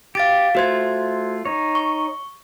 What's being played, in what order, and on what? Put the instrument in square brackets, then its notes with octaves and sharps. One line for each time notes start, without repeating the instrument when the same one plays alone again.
[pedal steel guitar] G4 [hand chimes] F5 A6 D7
[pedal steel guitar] A3 F4 [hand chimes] F#4 C5 G#6
[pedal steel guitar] D#4 C#5
[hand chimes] C#6